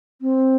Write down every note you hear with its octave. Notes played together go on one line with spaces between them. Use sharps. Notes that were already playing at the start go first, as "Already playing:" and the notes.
C4